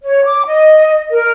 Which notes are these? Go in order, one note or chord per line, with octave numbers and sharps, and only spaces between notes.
C#5
D6
D#5
A#4